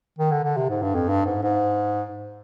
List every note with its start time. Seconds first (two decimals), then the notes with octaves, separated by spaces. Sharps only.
0.19 D#3
0.31 D3
0.44 D3
0.57 C3
0.70 G#2
0.82 G2
0.95 F2
1.09 G2
1.25 G#2
1.43 G#2